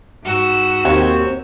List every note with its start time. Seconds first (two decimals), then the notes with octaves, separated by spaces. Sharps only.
0.23 G#2 F#4 E6
0.85 D#2 C4 C#5